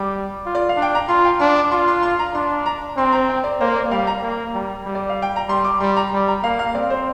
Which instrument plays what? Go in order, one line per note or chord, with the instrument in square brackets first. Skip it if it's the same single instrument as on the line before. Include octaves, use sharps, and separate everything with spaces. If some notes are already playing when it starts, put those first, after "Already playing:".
Already playing: [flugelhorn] G3 [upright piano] D6
[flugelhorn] F4
[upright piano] D5
F5
[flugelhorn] D4
[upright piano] G5
A#5
[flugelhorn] F4 [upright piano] C6
[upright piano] G5
[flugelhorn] D4 [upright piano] C6
[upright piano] D6
[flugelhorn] F4 [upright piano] C6
[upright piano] C6
C6
A#5
[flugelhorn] D4 [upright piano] C6
[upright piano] A#5
[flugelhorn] C4 [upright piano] C6
[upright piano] A#5
G5
D5
[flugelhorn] A#3 [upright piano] C5
[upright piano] D5
[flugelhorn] G3 [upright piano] F5
[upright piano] A#5
[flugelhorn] A#3
G3
G3
[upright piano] D5
F5
G5
A#5
[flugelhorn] G3 [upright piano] C6
[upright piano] D6
[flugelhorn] G3 [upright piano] C6
[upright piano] A#5
[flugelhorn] G3
[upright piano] A#5
[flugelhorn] A#3 [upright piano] F5
[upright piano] F5
[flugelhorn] C4 [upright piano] D5
[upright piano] C5